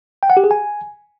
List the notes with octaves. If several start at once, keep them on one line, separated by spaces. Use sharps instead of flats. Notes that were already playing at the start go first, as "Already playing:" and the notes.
G5
F#5
G4
G#4
G#5